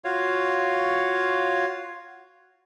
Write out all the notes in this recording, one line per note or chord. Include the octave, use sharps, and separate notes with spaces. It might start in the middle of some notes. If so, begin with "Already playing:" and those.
F4 F#4 C#5 F5